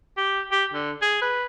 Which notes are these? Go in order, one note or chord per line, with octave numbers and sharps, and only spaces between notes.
G4
G4
D3
G#4
B4